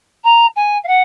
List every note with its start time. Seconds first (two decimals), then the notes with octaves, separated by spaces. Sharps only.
0.24 A#5
0.56 G#5
0.83 F5
0.87 F#5